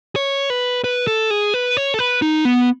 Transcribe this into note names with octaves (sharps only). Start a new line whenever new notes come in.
C#5
B4
B4
A4
G#4
B4
C#5
A4
B4
D#4
B3